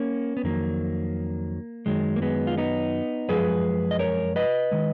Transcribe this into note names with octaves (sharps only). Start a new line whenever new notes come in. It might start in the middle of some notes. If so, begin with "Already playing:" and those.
Already playing: A#3 C#4
B3
F2 D#3 F#3 A#3
F#2 D#3 F#3 G#3
A#3
G#3 B3
F4
B3 D#4
F#2 F3 G#3 G#4 B4
D#5
A#4 C#5
B4 D#5
D#3 G#3